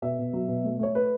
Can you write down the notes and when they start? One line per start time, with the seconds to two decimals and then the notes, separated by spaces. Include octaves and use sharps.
0.02 B2 E5
0.19 B2
0.33 F#3
0.48 B2
0.64 A3
0.79 A3 C#5
0.95 A3 B4